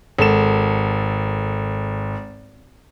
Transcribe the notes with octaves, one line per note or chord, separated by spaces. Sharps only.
G#1 A4 E7